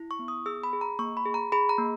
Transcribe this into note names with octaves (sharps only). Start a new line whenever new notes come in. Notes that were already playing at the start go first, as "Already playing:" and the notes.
Already playing: E4
C#6
B3
D#6
G#4 E6
B5
G#4
A#5
A#3 C#6
B5
G#4
A#5
G#4 B5
A#5
A#3